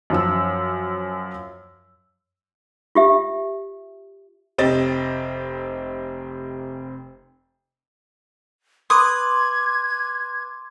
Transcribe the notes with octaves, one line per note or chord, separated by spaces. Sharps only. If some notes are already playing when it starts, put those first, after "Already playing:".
F#2 F3 E6
F4 G4 E5
F1 C4 G4 D#5 A6
B4 C6 D6 D#6 G#6